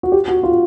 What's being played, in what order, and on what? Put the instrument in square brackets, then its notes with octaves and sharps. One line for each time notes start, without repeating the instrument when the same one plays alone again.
[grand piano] F#4
G4
F#4
F4